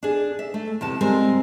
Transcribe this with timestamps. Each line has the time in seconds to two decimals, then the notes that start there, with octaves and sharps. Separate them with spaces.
0.03 D4 G#4
0.39 E5
0.54 A3
0.81 E2 C3 A5
1.01 G3 G#3 C4 A#4